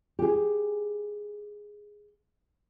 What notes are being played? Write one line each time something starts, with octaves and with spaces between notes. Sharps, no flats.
G4 G#4